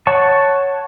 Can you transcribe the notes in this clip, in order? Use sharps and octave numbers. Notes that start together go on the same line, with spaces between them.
C#5 F#5 A5 C#6